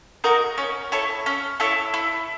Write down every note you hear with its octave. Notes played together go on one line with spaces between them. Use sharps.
D#4 F#4 A#4
C#4
E4 A4 C#5
C#4
E4 A4 C#5
E4